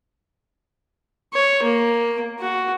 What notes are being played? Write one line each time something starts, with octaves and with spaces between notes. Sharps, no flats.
C#5
A#3
F#4